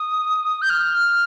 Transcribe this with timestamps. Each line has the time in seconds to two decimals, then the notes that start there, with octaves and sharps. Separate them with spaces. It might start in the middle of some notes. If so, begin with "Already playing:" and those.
Already playing: D#6
0.62 G6
0.70 F6